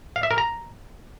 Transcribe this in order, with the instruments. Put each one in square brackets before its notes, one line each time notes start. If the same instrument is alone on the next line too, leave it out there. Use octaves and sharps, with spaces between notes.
[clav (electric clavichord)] F5
E5
A#4
A#5